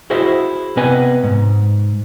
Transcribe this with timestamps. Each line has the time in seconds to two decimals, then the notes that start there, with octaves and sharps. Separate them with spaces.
0.10 E4 F#4 G#4 C5 D#5 E5
0.77 C3 B3 B4 D#5 G#5
1.23 G#2